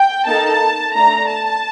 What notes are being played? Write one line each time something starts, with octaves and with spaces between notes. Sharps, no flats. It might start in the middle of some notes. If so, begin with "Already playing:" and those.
Already playing: G5
A#3 D#4 A4 A5
A3 D4 A4 A#5
A5